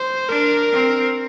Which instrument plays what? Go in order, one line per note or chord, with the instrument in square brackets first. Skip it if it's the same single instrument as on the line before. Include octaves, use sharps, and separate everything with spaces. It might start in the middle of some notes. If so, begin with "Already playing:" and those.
Already playing: [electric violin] C5
[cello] D4 [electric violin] A#4
[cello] C4